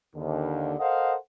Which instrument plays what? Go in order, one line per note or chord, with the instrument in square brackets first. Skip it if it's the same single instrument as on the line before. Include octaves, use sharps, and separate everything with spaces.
[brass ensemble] D#2 D3
A4 A#4 C5 D#5 F5 F#5